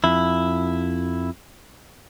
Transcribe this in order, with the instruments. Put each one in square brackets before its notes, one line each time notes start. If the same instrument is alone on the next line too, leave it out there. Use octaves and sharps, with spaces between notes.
[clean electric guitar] F2 E4